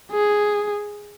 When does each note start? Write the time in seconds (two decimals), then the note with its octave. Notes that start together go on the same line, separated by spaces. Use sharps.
0.12 G#4